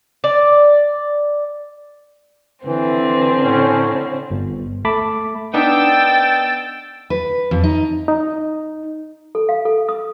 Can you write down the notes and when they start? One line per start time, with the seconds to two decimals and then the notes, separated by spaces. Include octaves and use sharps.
0.24 D5
2.66 D3 E3 C4 C5
3.43 A2 C#4
4.30 G1
4.85 A3 A5 B5 D6 B6
5.54 B3 D4 D#4 G5 E6 A6
7.10 B4
7.51 F2
7.64 D#4
8.08 D#4
9.35 A4
9.49 F5
9.65 A4
9.89 D#6